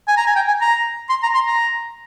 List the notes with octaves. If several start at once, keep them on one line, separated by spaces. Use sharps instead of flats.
G#5
A#5
G#5
G5
G#5
A#5
C6
A#5
C6
A#5